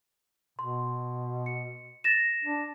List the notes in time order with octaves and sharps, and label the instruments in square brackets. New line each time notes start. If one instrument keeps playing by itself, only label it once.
[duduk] B2 [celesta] C6
[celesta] C#7
A6 A#6 E7
[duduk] D4